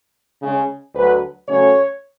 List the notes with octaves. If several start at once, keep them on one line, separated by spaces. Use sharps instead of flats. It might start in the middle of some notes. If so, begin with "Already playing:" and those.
C#3 G#3 C#4
D2 D3 F#3 B4
C#3 F#3 A3 C#4 C#5